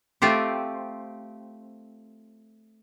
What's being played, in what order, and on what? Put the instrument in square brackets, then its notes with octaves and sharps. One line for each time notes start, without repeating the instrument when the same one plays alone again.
[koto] A3 C4 F4 G4